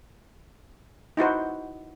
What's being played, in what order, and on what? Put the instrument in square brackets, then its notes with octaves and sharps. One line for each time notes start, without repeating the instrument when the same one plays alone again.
[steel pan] D#4 E4 F#4 C5